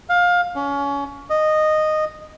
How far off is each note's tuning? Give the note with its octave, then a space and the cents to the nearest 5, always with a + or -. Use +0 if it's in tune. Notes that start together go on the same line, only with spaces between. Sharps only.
F5 +20
C#4 +25
D#5 -10